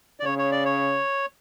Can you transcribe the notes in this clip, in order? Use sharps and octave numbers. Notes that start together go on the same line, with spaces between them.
D5
C#3 C#5
C#5
D5
C#5